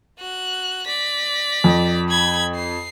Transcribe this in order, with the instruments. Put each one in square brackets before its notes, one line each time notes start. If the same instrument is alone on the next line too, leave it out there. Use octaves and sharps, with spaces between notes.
[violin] F#4 F#6
D5 B6
[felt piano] F2
[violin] B5 G#6
C7